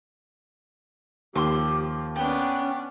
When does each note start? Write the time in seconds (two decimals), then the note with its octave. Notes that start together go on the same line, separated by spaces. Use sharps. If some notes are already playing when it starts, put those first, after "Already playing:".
1.35 D#2 F3 G4 C6 E6
2.16 B3 C#4 D4 G5